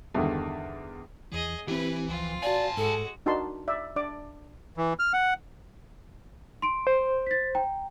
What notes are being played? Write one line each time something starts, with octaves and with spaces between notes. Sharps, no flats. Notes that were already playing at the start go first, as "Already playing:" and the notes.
E2 G2 D3 D#3
E2 E3 G#4 D#5
E3 C4 E4 G4 B4 G#5
C#2 F3 C4 F4
F#4 D5 F5 G#5 A5
G#2 G#3 F#4 A4
D4 D#4 F#4 A#4 A5 C6
D5 E5
D4 D5 D6
E3
F6
F#5
C6 D7
C5
A6 B6
G5 A#5